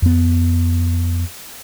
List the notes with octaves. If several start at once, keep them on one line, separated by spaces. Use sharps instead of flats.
F2 B3